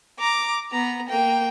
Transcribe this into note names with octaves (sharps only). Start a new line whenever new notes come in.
A#5 D6
B3 A#5
A#3 G5